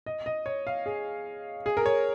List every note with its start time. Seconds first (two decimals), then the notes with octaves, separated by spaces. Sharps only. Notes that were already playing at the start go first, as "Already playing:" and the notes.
0.06 D#5
0.26 D#5
0.46 C#5
0.67 F5
0.86 G#4
1.66 G#4
1.77 A#4
1.86 C#5